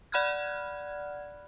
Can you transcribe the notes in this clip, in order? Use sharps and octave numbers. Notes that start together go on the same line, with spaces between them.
D5 F#5 B5 F6 F#6 G#6